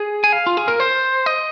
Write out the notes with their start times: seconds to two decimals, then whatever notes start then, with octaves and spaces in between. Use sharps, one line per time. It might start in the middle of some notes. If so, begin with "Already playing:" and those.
Already playing: G#4
0.24 G#5
0.33 F5
0.47 F4
0.57 G#4
0.68 A#4
0.80 C5
1.26 D#5